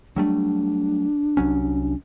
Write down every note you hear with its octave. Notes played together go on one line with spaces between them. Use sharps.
F#3 G3 A3 D4
C2 F#3 C#4